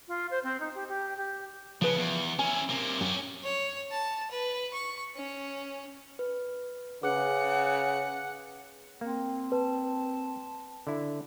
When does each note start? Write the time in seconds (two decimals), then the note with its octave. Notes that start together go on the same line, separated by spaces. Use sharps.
0.08 F4
0.31 C5
0.43 C4
0.60 D#4
0.75 G4
0.88 G4
1.17 G4
1.82 C#3 F3 C#4 B4
1.97 E2
2.39 C#4 E4 G#5
2.69 C3 A#3
3.01 F#2 C#4 G4
3.43 C#5
3.91 A5
4.31 B4
4.73 C#6
5.16 C#4
6.19 B4
7.03 C#3 G#4 B4 F#5 D6
9.01 A#3 C4
9.52 B4 A5
10.87 D3 E4